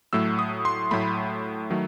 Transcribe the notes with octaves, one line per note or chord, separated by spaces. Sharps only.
A2 F#3 A3 E6
D#6
C6
A2 F#3 A3 B5
D#3 F#3 A3